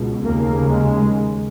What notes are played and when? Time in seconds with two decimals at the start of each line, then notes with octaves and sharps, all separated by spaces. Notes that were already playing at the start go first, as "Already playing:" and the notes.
Already playing: C#2 B2
0.25 D#2 C#3 A#3
0.69 G#3